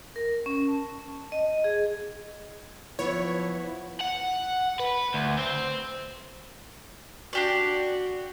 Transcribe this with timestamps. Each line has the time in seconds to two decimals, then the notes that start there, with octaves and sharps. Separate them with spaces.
0.16 A#4
0.46 C#4
0.68 A5
1.32 D#5
1.64 G#4
2.99 F3 B3 E4 C#5
4.00 F#5
4.79 B4
5.14 D2
5.39 C4
7.33 D4 F#4 G4 D5